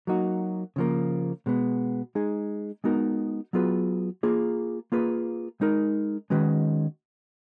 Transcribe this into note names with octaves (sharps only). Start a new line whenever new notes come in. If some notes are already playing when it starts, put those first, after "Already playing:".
F#3 A#3 D#4 F#4
C#3 F3 A#3
B2 G#3 B3
G#3 D#4 G#4
G#3 B3 D#4 F#4 A#4
F#3 B3 F4 G#4 B4
A#3 F4 G#4
A#3 F4 G#4 B4
G#3 D#4 A#4
D#3 G#3 C#4 F#4 B4